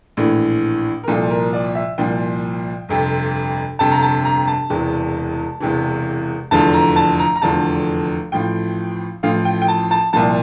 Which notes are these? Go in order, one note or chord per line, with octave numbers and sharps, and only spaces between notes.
A#1 A2 E3
A#4
C2 A#2 F3 A4
A#4
D5
E5
C2 A#2 F3 G5
G1 F2 C3
G1 F2 C3 A5
A#5
A5
A#5
A5
E1 E2 C3 E3
E1 E2 C3 E3
F1 E2 D3 F3 A5
A#5
A5
A#5
A#5
F1 E2 D3 F3 A5
A1 A2 F3 G5
A1 A2 F3 F5
G5
G5
A5
A5
C2 A#2 F3 A5